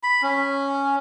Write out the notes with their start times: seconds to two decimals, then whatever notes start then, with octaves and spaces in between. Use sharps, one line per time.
0.03 B5
0.23 C#4